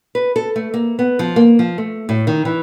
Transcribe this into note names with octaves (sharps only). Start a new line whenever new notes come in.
B4
A4
A3
A#3
B3
F3
A#3
F3
A3
A2
D#3
E3